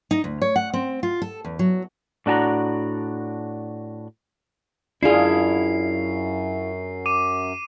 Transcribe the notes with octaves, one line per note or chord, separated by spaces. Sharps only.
D#4
D2
C#5
F#5
C4
F4
A4
E2
F#3
A2 D4 F#4 A5 A#5
F#2 D4 E4 F4 G#4 F5 C7
D6 D#7